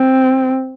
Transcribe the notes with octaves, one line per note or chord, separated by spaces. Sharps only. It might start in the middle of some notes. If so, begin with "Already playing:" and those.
Already playing: C4